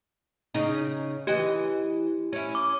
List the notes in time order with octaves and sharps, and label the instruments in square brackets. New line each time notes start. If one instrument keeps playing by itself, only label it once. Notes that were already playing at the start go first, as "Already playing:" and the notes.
[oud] C#3 D#4
[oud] E3 D#5 [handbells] G4
[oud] C#4 E4
[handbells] D6